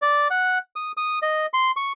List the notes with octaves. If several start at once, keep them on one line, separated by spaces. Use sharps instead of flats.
D5
F#5
D#6
D#6
D#5
C6
C#6